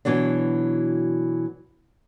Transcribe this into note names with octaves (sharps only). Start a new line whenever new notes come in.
B2 E3 F#3 D4